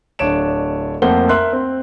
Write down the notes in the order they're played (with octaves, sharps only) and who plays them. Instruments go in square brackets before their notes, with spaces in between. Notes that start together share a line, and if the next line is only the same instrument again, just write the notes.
[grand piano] D1 D4 C#5 D7 E7
F2 A3 A#3 C5 F#5 G7
A#4 E5 C6 F#6
C4